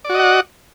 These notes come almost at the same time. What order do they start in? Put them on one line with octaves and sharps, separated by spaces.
D5 F#4 D#5 F#5